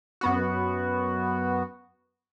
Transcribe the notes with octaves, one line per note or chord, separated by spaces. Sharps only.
F#2 B3 F#4